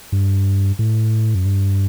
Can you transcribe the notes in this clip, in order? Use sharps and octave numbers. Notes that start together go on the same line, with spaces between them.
G2
A2
F#2
G2